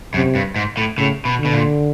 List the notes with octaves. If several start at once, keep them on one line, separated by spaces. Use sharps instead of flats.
F#2 C3
G2
G#2
A2
A2 C#3
B2
D3
B2
A#2